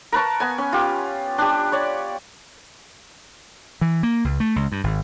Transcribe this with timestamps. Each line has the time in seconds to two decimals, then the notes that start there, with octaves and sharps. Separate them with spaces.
0.12 A#4 B4 A5 C#6
0.40 B3 G#5
0.58 C#4
0.73 F4 G4
1.38 D4 G4
1.72 C#5 D5
3.81 E3
4.03 A#3
4.24 C#2
4.40 A3
4.56 C#2
4.72 G2
4.84 G#1